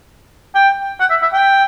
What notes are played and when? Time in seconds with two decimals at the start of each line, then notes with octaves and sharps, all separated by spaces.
0.55 G5
1.00 F#5
1.10 E5
1.22 E5
1.33 G5